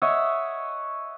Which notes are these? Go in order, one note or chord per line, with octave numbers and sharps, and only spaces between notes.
C#5 D#5 E5 F#5